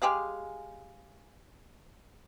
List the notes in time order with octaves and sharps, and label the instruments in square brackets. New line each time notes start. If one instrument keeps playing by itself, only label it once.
[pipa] G#3 G4 G#4 F5